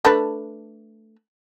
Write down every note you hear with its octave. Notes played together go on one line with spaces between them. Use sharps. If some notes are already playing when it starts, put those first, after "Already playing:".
A3 D4 B4